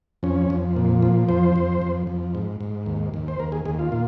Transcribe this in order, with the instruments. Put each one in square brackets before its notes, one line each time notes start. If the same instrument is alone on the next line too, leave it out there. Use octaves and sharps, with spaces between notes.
[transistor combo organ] F2 C#4
F2
A#2
F3
F2 C5
F2
F2
F2
G#2
G#2
D#2
D#2
C5
D#2 A#4
G#4
D#2 G#4
F4
A#2